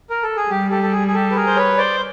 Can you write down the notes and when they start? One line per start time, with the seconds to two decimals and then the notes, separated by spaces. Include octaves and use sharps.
0.10 A#4
0.23 A4
0.37 G#4
0.50 G3 G4
0.71 G4 A4
0.82 A4
0.92 G#4
1.07 G#4
1.14 G4 A4
1.31 B4
1.35 G#4 A#4
1.46 C5
1.56 B4 C#5
1.78 C5 D5